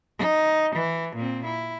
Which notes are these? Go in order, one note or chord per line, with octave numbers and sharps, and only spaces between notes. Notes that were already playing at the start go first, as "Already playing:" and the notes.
D#4
E3
A#2 C4
E4